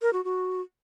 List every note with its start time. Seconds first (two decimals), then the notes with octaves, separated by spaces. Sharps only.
0.02 A#4
0.13 F#4
0.24 F#4